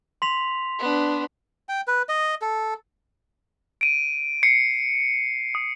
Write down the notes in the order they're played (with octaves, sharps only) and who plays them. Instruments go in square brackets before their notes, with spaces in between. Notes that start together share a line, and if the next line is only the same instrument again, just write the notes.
[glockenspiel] C6 B6 F7
[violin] B3 D4
[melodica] G5
B4
D#5
A4
[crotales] D7 D#7
C7 C#7
D#6